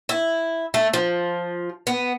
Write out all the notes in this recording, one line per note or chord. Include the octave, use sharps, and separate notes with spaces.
E4
A3
F3
B3